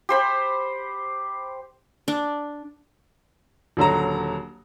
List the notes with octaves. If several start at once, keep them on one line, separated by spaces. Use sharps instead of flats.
G4 C5 B5
D4
D#1 D3 F#3 A#5